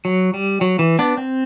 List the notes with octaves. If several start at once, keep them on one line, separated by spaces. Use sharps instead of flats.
F#3
G3
F#3
E3
B3 D4
C4